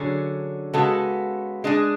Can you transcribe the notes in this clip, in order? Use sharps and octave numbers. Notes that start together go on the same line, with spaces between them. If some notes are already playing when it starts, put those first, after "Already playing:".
Already playing: D3 F#3 C#4 G#4
C#3 G#3 B3 F#4 A4
G#3 D4 G#4